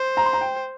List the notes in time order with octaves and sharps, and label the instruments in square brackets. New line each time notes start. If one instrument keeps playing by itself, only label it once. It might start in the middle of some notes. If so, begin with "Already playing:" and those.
Already playing: [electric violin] C5
[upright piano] A#5
C6
A#5
G5